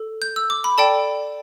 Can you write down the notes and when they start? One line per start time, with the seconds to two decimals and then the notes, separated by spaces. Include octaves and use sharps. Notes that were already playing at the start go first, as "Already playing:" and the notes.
Already playing: A4
0.22 G6
0.36 E6
0.50 D6
0.64 B5
0.78 A4 D5 G5 A5